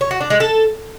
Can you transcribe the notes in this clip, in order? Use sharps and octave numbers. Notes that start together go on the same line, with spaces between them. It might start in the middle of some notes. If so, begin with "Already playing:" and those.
C#5
F#4
D4
G#3
A4